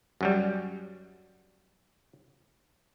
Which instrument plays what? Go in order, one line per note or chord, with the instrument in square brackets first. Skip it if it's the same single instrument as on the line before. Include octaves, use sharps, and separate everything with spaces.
[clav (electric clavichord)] F#2 F#3 G3